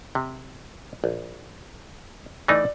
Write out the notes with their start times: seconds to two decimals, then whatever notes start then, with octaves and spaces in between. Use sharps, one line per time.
0.15 C3
1.04 A#1
2.48 E3 A3 D#4 D5